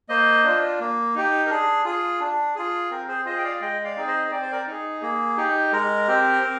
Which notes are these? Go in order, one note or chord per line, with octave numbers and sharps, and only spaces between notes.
A#3 C5 D#5
D4 F4
A#3
D#4 G4
A#4
D4 G#4
F4 G#4
D4
F4 G#4
C4 A#4
G#4 C5
F4 G#4 C5 D#5
G5
D5 F5
G#3 D#5 G5
D5 F5
C4 D#4 G#4
C5 D#5
C4 D5
C5
A#4 D5
D#4 G#4
A#3 G#4
D#4 G4
G#3 A#4
C4 G4
C4